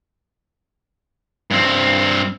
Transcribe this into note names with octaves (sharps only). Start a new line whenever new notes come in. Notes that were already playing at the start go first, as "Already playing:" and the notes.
G2 C4